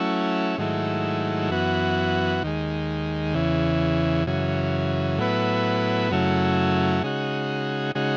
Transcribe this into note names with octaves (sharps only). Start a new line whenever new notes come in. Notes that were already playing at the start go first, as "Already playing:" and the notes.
Already playing: F#3 A3 C#4 E4
G#2 D#3 F#3 A3 E4
F#2 E3 B3 F#4
D#2 D#3 G#3
E2 C#3 E3
F#2 C#3 E3
A2 F#3 B3 E4 B4
F#2 C#3 F#3 A3 E4
C#3 G#3 D#4 F#4
C#3 G#3 D#4 F#4